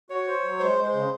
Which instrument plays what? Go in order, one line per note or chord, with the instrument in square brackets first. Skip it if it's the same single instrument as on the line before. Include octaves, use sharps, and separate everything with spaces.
[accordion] F#4 [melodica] C#5
[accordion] C5
F#3
[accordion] G#3 [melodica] C5
[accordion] G#3
[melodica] C5
[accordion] C#3